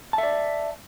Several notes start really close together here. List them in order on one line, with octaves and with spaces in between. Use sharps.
A5 E5 D5